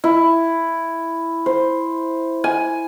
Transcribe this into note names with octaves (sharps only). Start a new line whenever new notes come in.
E4
C5
G#5